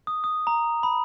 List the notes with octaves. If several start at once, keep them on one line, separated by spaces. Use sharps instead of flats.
D#6
D#6
A#5
B5